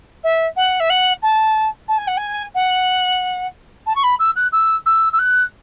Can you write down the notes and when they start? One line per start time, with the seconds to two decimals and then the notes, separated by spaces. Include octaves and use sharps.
0.23 E5
0.56 F#5
0.80 E5
0.90 F#5
1.22 A5
1.88 A5
1.98 G#5
2.07 F#5
2.17 G#5
2.54 F#5
3.86 A5
3.95 C#6
4.03 B5
4.19 E6
4.36 F#6
4.52 E6
4.86 E6
5.13 E6
5.19 F#6